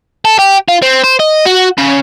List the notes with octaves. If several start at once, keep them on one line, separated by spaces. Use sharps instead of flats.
A4
G4
F4
C4
C5
D#5
F#4
C#3